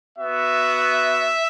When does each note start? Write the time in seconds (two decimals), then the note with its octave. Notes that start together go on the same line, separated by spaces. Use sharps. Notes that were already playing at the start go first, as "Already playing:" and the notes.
0.16 B3 F#4 E5